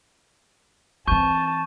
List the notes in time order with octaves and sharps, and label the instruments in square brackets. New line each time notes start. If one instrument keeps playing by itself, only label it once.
[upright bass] E3 C4 [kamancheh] A5 [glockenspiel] C#6 G6 D#7